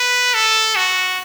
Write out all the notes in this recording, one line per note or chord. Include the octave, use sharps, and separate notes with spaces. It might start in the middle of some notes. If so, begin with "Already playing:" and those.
Already playing: B4
A4
F#4